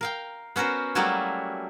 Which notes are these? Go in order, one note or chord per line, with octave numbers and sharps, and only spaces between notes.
A#4 F5 G5
B3 C#4 F#4 A#4 C5
F#3 G3 A3 A#3 E4 F#4